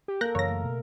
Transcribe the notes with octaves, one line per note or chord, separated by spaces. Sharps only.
G4
A#3 A4 A#4 F#6 G6 A#6
F#2 C#3 E3 C#5 A#6
A3
B2